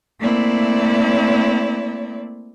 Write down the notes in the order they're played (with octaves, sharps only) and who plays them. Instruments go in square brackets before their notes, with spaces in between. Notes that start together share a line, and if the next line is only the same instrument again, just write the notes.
[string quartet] A3 A#3 C4 E4 D5